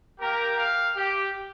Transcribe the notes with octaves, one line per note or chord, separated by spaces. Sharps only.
A#3 G4 A#4
F5
G4